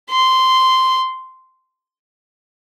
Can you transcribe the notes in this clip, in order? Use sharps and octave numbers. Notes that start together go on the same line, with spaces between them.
C6